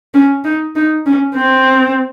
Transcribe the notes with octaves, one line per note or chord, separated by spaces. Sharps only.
C#4
D#4
D#4
C#4
C4